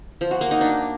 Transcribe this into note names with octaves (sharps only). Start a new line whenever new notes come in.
F3
F#4
A#3
D#4
D4